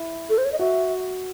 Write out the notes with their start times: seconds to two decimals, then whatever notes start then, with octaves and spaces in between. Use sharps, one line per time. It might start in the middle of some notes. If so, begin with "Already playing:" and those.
Already playing: E4
0.30 A4
0.38 C5
0.45 C#5
0.52 D#5
0.59 F#4 E5